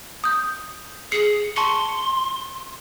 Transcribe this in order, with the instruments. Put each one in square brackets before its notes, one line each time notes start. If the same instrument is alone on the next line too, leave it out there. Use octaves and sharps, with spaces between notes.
[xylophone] D#6 G6
[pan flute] G#4 [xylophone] C7 C#7
[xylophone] A5 C#6 C#7 [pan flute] C6